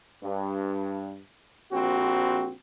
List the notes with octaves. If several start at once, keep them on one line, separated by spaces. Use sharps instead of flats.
G2
A#1 C4 F#4